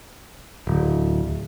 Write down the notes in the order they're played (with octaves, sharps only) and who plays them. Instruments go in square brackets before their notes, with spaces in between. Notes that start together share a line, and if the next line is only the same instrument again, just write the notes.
[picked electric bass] D1